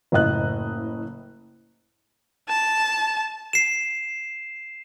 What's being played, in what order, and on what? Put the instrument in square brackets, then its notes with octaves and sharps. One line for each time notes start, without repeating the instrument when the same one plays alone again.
[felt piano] F#1 A2 D#5 F#6
[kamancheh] A5
[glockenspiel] C7 E7